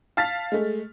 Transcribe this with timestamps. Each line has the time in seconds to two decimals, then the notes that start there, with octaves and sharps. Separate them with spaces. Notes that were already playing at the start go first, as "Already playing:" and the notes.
0.17 F5 A5 F6 A6 B6
0.52 G#3 A3